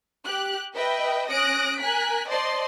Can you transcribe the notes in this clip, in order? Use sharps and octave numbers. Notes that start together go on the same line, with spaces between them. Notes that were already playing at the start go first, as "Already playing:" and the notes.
G4 F#6
B4 D#5 E5 G5
C#4 D#6 F#6 A#6 D7
A#4 G#5 F#6 B6
C5 D5 D#5 A5 C6